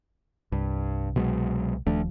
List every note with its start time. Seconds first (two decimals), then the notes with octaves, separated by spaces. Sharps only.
0.52 C2 G2
1.16 B2 F#3 G#3
1.87 D#1 D#2 F3 A3 D4